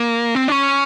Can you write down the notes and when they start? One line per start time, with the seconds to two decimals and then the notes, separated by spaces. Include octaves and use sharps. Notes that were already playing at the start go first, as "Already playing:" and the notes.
Already playing: A#3
0.35 C4
0.48 D4
0.52 C#4